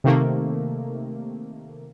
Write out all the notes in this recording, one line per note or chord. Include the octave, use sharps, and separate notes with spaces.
C3 D#3 A3 A#3